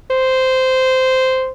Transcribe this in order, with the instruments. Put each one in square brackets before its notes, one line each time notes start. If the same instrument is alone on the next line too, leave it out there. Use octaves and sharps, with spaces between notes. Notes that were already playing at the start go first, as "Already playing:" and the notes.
[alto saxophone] C5